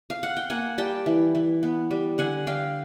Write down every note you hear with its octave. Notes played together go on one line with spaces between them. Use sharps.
F5
F#5
G5
A#3 F#5 G#5
G3 G5 A5
E3
E3
B3
G3
D3 F#5 G#5
D3 F5 G5